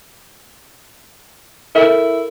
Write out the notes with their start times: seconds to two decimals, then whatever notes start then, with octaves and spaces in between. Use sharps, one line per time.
1.75 E4 A4 A#4 E5